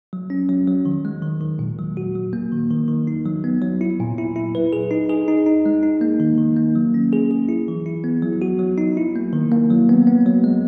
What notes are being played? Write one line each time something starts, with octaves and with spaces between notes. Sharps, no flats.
F#3
C#4
F#3
F#3
D#3
G#3
D#3
D#3
A#2
F#3
F#4
F#3
A#3
D#3
D#3
D#3
D#4
F#3
B3
F#3
E4
A#2
E4
E4
B4
G#4
D#4
G#4
D#4
D#4
G#3
D#4
A#3
D#3
D#3
A#3
F#3
C#4
G#4
G#4
E4
E3
E4
B3
F#3
F#4
F#3
D#4
E4
A#3
D#3
A#3
F#3
B3
B3
F#3
G#3